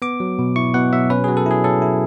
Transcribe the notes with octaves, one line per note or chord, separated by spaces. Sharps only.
B3 D6
F#3
B2
E4 C#6
B2 F#5
F#3 E5
C#4 B4
F#3 G#4
A4
E4 G#4
F#3 A4
E4